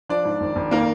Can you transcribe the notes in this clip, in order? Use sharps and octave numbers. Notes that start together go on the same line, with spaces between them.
F3 D4 D5
G#2
G#1
G#1
D#3 A#3 A#4